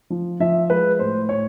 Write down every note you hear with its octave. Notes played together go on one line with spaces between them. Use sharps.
F3
F3 E5
G#3 B4
A2 C5
A2 C#5